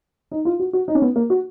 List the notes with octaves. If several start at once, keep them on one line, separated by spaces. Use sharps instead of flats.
D#4
F4
F#4
F#4
D#4
C#4
B3
A#3
F#4